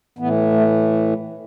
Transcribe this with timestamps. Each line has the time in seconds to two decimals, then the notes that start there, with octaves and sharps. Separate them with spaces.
0.19 A2 E3 B3
0.53 A3